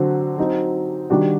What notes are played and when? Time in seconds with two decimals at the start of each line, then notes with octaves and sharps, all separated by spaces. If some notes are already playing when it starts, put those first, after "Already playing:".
Already playing: D3 F#3 C4 F#4
0.38 F#3 C4 D#4
1.10 D#3 G3 D4 F#4